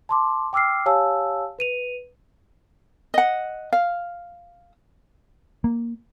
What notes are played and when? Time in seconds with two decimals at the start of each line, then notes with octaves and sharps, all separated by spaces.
0.09 A5 C6 D6
0.53 G5 D6 E6 F6 C7
0.86 G4 C#5 F5 G#5 A5 E6
1.59 B4 D#7 F7
3.14 D#5 F#5
3.73 F5
5.64 A#3